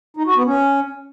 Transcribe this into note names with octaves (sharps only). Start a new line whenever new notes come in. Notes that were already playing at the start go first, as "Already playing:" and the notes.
D#4
F#4
B3
C#4